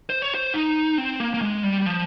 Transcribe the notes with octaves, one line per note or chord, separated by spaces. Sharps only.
C5
C#5
C5
D#4
C4
A#3
A#3
G#3
G3
F3